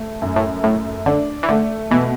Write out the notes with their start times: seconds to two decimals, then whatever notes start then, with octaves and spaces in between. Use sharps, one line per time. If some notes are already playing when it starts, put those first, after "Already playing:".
Already playing: A3
0.22 F#2
0.36 A2
0.63 A2 A3
1.06 D3 D4
1.43 E3
1.49 D3 A3
1.91 B2 E3